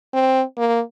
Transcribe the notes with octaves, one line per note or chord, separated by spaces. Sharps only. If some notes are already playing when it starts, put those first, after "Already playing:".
C4
A#3